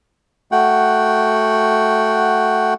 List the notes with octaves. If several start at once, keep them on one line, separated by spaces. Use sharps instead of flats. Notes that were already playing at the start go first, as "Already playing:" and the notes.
A3 F#4 F#5 G5